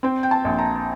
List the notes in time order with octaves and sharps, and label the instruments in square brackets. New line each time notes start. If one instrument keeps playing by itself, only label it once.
[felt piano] C4 G5
G5
A5
A#1
A#5